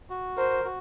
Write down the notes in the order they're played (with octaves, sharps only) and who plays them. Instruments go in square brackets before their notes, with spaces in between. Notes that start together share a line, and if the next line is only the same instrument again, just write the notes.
[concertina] F#4
[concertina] A#4 [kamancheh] C5
[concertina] F#4